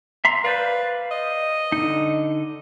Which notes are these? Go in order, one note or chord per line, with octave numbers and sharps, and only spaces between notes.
E5 A#5 C6
B4 C5 D5 F5
D#5
D3 D#4